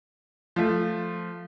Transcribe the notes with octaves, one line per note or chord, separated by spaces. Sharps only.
F3 A3